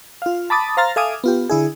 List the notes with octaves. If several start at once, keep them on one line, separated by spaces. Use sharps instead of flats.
F4 F5
A5 B5 D6 D#6 A6
C5 F5 A#5 C6 F6 A6
A4 E5 F5 G#5 D6 D#6
B3 F4 G4
D3 E4 G#4